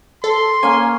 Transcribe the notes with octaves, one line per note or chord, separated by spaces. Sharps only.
A4 C6
A#3 C#4 G#5